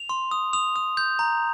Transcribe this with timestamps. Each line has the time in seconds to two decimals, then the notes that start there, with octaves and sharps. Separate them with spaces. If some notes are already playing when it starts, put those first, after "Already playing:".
Already playing: F7
0.09 C6
0.31 D#6
0.53 D#6 F7
0.76 D#6
0.97 G6
1.19 A#5